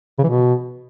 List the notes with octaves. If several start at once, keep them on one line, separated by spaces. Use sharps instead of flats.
C#3
E3
B2